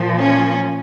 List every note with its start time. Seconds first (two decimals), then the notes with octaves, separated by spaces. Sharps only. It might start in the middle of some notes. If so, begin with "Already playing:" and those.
Already playing: A#2 F3
0.18 C#4